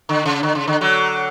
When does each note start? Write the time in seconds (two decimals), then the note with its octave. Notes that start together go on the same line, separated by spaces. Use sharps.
0.09 D3
0.25 C#3
0.43 D3
0.55 C#3
0.67 D3
0.81 D3 F#3